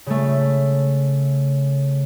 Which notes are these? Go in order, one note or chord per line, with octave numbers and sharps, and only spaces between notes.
C#3 A3